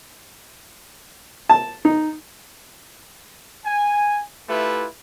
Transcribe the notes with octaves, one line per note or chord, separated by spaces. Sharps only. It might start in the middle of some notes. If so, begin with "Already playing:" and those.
A5
D#4
G#5
A3 E4 F4 G4 B4